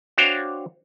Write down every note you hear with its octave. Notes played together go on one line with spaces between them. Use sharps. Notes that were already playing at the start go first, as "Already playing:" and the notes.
D4 F#4 C5 C#5 F5 G5